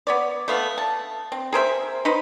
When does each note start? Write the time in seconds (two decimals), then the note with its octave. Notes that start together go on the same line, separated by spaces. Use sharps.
0.07 B3 C#5 D5
0.48 A3 B3 F5
0.78 A5
1.32 C4
1.53 G#4 A#4 C5 E5
2.05 D#4 B4 C5